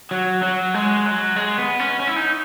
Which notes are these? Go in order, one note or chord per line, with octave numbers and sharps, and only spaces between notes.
F#3
F#3
G#3
F#3
G#3
B3
C#4
C#4
E4
D#4